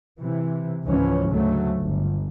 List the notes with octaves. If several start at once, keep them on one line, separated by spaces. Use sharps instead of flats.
C3 E3
C#2 G#2 E3 F3 C#4
D2 C#3 F#3 A3
G1